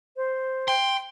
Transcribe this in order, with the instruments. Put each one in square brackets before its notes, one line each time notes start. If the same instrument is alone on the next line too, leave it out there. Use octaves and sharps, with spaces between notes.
[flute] C5
[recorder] G5 [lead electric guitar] C6